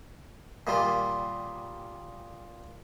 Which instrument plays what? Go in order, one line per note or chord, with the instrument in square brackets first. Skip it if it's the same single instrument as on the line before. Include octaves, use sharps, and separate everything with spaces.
[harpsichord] A#2 D#3 G3 F4